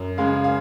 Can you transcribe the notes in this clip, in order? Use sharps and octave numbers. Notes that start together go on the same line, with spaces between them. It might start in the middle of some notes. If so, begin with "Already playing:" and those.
Already playing: F#2
C#3 G#3 F5
F5